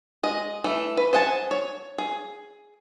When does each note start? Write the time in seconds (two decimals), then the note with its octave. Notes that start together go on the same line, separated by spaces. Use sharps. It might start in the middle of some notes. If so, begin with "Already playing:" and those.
0.23 G#3 D#5
0.64 E3 A3
0.97 B4
1.13 C5 D#5 F#5 G#5 A5
1.51 C#5
1.98 G#4